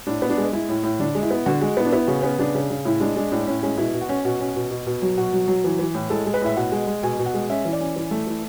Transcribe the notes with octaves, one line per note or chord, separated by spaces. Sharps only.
A2 D4
B3
D4
G#3
G#3 E4
A2
A2
D3 D4
G#3
E4
B3
D3 F#4
G#3 F#4
B3 E4
D4
B3 E4
C#3 F#4
B3 C#4
C#3 D4
C#3
C#3
A2 E4
G#3 D4
G#3 D4
A2 D4
A2 C#4
G#3 C#4
B2 E4
B2
F#4
C#4
B2 F#4
C#4
B2
B2
B2
F#3
B2 F#4
F#3
F#3
E3
E3
A2
G#3 A4
G#3
B4
A2 E5
B2 F#5
G#3
G#3
B2 G#5
B2
F#5
G#3
C#4 E5
E3
D5
C#4
E3
A3
E3